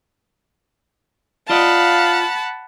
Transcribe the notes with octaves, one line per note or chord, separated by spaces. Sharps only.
F4 D5 D#5 F5 F#5 A5 B5